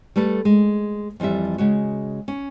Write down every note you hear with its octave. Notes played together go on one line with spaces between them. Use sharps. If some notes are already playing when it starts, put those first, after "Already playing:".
G3 A3 A4 B4
G#3
F2 E3 F3 G3 E5
C#3 G#3 F#4
C#4